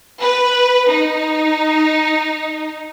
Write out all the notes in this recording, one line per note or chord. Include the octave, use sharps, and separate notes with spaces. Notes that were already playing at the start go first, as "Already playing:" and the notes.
B4
D#4